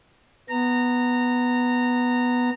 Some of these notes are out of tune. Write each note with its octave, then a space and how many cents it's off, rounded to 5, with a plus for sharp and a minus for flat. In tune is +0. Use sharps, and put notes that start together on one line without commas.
B3 +0 A#5 -20